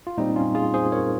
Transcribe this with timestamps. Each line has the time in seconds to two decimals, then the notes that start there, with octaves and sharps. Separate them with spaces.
0.07 F4
0.18 A#2 G3 C4 D#4
0.36 C#4 F4
0.55 F4 G#4
0.74 G#4 C5
0.92 A#4 C#5